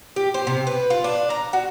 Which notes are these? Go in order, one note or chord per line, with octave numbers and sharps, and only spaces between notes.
G4
C5
C3
B4
F4
D4
A#5
F#4